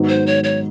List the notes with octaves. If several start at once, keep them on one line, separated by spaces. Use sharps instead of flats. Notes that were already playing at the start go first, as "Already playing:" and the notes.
Already playing: G#2 D#3 F#3 B3 D#4
C5
C#5
C#5